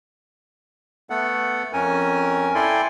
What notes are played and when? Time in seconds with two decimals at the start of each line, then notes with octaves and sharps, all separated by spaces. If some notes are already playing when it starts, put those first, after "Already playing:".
1.10 A3 B3 A4 F#5
1.73 F2 C#4 A#4 G#5
2.55 E4 A4 D5 G5 G#5 C6